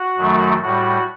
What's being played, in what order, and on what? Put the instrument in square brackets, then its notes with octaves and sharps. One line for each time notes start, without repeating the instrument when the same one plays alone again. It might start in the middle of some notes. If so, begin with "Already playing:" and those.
Already playing: [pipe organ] F#4
F#2 D#3 F#3 A3
A2 G3 F#4